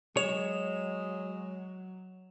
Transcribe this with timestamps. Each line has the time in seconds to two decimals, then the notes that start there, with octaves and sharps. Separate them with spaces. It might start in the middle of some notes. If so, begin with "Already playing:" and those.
0.17 F#3 G#3 C#5 E7 F7